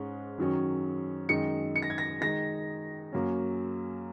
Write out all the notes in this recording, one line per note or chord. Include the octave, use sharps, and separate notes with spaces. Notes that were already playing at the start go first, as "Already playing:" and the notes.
Already playing: G#2 G#3 C#4
F#2 D#3 F#3 C#4
F#2 D#3 G#3 D#4 C#7
C#7
A#6
G#6
A#6
D#3 G#3 D#4 A#6
F#2 F#3 A#3 C#4